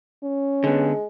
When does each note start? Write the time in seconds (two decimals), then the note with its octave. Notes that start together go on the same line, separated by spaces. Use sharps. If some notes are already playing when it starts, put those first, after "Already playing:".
0.23 C#4
0.64 D3 G#3 B3